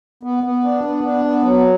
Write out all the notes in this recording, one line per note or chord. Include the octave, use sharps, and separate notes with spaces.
B3
B3
D4
B3
D4
B3
F#3